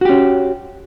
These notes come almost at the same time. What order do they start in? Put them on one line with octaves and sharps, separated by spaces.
F#4 G4 C#4